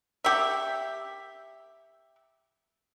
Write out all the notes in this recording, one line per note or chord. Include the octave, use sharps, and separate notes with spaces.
G4 E5